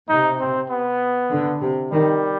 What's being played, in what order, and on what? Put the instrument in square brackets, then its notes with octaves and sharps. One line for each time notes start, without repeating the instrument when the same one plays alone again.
[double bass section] C3 [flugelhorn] D#4
[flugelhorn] C4
B3
[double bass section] D3
C3
[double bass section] D#3 [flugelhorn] G3